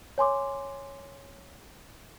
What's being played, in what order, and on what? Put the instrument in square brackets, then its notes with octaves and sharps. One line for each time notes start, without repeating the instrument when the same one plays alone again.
[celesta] C#5 G#5 C6 D6